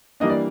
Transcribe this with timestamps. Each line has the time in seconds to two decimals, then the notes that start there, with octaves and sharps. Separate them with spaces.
0.20 E3 G3 A#3 D4 D#5
0.30 D5